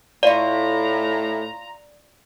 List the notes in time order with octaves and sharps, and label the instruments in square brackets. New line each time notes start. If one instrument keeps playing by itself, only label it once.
[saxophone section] A2 [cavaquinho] F4 C#6 [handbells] D5 [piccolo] A#5